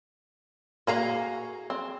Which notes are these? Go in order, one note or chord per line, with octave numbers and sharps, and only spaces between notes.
A#3 F#4 G#4 F5 A#5
C4